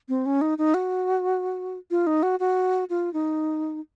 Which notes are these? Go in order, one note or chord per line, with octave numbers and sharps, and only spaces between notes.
C4
C#4
D#4
D#4
F#4
F4
D#4
F#4
F#4
F4
D#4